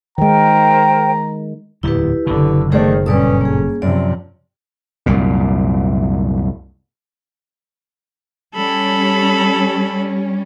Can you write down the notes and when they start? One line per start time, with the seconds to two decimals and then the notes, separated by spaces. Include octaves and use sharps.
0.18 D#3 G#3 A#4 C5 G5 A#5
1.83 D1 E2 A#2 E4 G4 B4
2.27 F#1 B2 D3
2.72 D3 D#3 A3 D#4 G#4 C5 D5
3.06 G2 A#2 C#4 A4 B4 D5 D#6
3.41 A#3 G#4
3.82 F#2 C3 F3 D5
5.06 C2 F#2 A#2
8.55 G3 C#4 A4 B5